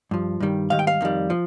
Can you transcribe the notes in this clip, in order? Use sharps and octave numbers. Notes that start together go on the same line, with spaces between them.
G2 F3
G2 D#3 G3
G#2 D#3 G3 F5
G5
F5
F2 D#3 G3
F3